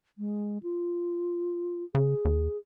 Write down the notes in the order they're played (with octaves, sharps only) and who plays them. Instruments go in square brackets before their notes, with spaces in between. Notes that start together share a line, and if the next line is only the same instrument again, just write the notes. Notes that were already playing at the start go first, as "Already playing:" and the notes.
[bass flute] G#3
F4
[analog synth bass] C#3 [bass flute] G#4
[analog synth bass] D#2